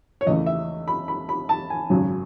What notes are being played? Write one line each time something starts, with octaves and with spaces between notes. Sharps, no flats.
C#5
E2 C#3 E3 A3 D#5
E5
B5
B5
B5
A5
G#5
G#1 F#2 C#3 F#3